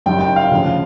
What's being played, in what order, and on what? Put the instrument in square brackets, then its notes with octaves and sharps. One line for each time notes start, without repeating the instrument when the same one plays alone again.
[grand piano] F#1 F#2 D#3 G3 G5
G5
F5
D2 C#3 F3